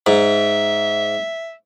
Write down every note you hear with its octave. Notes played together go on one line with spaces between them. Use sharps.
G#2 E5